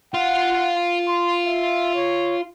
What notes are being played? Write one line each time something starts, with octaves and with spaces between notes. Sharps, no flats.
F4 F5 F#5
C6
E5
C#5